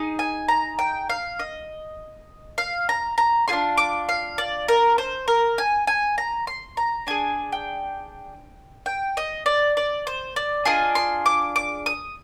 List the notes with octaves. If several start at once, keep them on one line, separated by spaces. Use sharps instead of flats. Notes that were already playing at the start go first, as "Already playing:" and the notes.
Already playing: D#4 G#4
G#5
A#5
G5
F5
D#5
F5
A#5
A#5
D4 F4 G#4 C6
D6
F5
D5
A#4
C5
A#4
G#5
G#5
A#5
C6
A#5
D4 G#4 G#5
G5
G5
D#5
D5
D5
C5
D5
D4 F4 G#4 D#5
C6
D6
D6
D#6